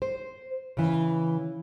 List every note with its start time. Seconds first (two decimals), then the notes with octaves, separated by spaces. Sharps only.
0.02 C5
0.77 C#3 E3